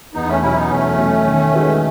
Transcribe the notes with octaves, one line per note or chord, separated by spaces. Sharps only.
E2 B3 D#4
A3 C#4
B2 F#3 C#4 E4
B3 D#4
E2 A3 C#4
B2 F#3
D#3
G#3 D#4 F#4 B4